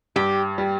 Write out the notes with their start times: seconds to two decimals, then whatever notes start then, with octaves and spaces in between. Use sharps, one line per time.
0.16 G2 G4
0.58 G3